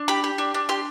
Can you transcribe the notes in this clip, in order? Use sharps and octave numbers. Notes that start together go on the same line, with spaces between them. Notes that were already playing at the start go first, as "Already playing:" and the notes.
Already playing: D4
G4 B5
G4
D4
D4
G4 C6